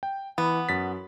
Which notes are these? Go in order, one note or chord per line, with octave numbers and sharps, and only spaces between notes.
G5
E3 B3
F#2 A6 B6